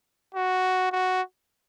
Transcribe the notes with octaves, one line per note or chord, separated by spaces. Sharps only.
F#4
F#4